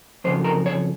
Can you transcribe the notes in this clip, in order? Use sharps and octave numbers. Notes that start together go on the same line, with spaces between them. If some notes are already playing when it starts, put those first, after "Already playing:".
F2 C#3 C5
A#4
C#5